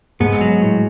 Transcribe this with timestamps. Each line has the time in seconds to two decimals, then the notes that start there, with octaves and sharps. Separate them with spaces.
0.20 G#2 G#3 B3
0.41 F#3
0.62 A2